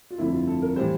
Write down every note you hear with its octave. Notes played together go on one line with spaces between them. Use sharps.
F4
G1 F2 D3 A3 E4
F4
A4
A#4
A2 E3 G3 C5